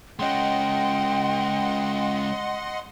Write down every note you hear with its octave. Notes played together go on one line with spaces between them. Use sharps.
G#3 C#4 D#5 F#5 G5 C6